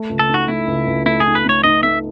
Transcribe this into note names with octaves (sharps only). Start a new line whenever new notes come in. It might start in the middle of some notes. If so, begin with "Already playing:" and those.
Already playing: A3
C#2
A4
D#4 F#4
A3 E4
C#2
C#2
A3 E4
D#4 G#4
B4
A3 C#5
D#4 D#5
A3 E5